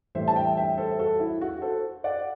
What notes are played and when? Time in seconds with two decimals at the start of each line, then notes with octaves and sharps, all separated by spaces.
0.15 A2 E3 G3 C5 E5
0.28 A5
0.36 E5 G5
0.57 E5 G5
0.78 A4 C5
0.99 F#4 A4
1.20 E4
1.41 F#4
1.62 A4 C5
2.04 D5 F#5